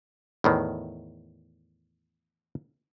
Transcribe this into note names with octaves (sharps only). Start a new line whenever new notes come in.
E2 A2 D#3